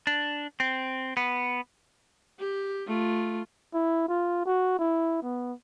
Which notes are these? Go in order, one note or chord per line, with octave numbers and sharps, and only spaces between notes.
D4
C4
B3
G4
A3 F4
E4
F4
F#4
E4
B3